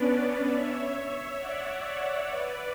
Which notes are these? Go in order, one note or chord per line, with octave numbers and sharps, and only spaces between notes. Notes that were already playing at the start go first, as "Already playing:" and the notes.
Already playing: B3 C#4 D4 B4 D5
C#5 E5
D5 F#5
C#5 E5
B4 D5